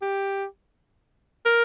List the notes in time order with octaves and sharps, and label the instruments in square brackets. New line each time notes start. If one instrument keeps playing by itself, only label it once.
[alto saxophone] G4
A#4